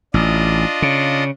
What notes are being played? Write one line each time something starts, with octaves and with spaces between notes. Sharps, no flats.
A1 D4 F4 D#5
C#3